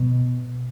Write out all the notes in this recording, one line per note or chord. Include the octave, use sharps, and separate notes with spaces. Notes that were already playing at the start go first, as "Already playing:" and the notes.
Already playing: B2